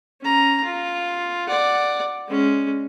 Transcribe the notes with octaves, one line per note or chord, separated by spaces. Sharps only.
C#4 A#5
F4
D5 F#5
G#3 C#4